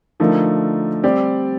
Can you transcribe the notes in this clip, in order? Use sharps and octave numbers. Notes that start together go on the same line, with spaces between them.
D3 F3 A3 D#4 A#4
G3 C4 G4 D5